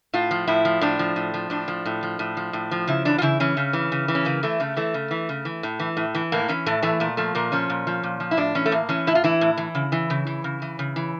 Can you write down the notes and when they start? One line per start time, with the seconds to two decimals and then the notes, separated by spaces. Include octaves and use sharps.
0.13 A2 F4
0.31 F3
0.47 A2 E4
0.65 F3
0.81 A2 D4
0.99 F3
1.16 A2
1.34 F3
1.50 A2 D4
1.68 F3
1.86 A2
2.03 F3
2.19 A2
2.37 F3
2.53 A2
2.71 F3
2.88 C#3 E4
3.05 E3 D4
3.18 F4
3.22 C#3 E4
3.40 E3 C#4
3.57 C#3
3.73 E3
3.92 C#3
4.08 E3
4.15 C#4
4.25 C#3 A#3
4.43 E3 A3
4.60 C#3 A3
4.77 E3 A3
4.94 C#3
5.11 E3
5.29 C#3
5.45 E3
5.63 A2
5.79 E3
5.97 A2
6.15 E3
6.32 A2 A#3
6.48 E3 C#4
6.66 A2 A3
6.82 E3 A3
7.00 A#2 A3
7.17 F3 A3
7.35 A#2 A#3
7.52 F3 C#4
7.70 A#2
7.87 F3
8.03 A#2
8.20 F3
8.31 E4
8.37 A2 D4
8.55 E3 C#4
8.66 A3
8.72 A2 A#3
8.89 E3 C#4
9.07 A2 E4
9.15 F4
9.24 E3 E4
9.41 A2
9.57 E3
9.75 C#3
9.92 E3
10.10 C#3
10.27 E3
10.44 C#3
10.62 E3
10.79 C#3
10.96 E3